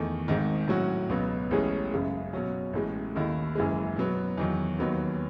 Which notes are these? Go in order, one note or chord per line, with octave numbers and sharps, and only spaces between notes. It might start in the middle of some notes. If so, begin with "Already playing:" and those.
Already playing: E2 D#3 A3
G#1 G#2 D#3
A2 F#3 C#4 F#4
C#2 B2 F#3 B3
A1 A2 G#3 C#4 G#4
F#1 F#2 C#3 G#3
B2 F#3 C#4 F#4
A1 A2 G#3
D#2 D#3 A3 E4
F#1 F#2 E3 G#3
B2 F#3 B3
E2 D#3 F#3
D#2 D#3 F#3 B3